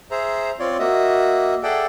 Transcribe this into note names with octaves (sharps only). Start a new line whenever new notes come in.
G#4 C5 E5 A#5
C4 F4 C#5 D5
A#3 F#4 D#5 E5
G#4 A4 D5 E5 F#5 G5